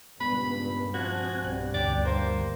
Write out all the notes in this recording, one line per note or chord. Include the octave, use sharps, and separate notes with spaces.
C#2 G2 A#2 B3 B5
F3 C4 F#4 G#5 F#6
B1 G2 G3
D2 B3 D4 G4 D5
A#3 C5